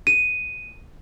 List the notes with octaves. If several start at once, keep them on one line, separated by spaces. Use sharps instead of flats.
D#7